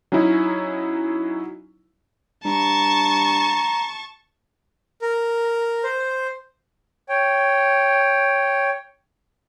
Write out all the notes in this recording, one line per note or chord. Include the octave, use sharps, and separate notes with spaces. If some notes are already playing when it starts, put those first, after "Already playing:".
F#3 C#4 D#4 E4
G2 A5 A#5 C#6
A#4
C5
C#5 G5